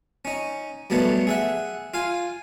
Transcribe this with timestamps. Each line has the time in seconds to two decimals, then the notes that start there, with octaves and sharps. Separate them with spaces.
0.25 C#4 D#4
0.90 F#2 B2 F#3 G3 A3 B3
1.27 G#4 E5 F#5
1.94 F4 F5 G#5